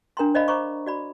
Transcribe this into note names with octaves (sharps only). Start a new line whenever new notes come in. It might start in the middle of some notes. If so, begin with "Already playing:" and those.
D4 A#4 G5 A#5 C6
C5 D5 D#5 F5 B5
C5 A#5 C#6 D6
F#4 D5 B5